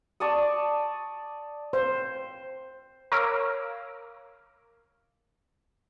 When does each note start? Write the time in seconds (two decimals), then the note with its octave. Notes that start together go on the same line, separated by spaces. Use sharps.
0.20 D5 A5 C#6 D#6
1.73 C5
3.12 A#4 C#5 F5 D6 E6